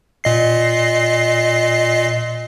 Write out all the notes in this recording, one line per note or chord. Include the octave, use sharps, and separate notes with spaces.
A#2 D#5 C7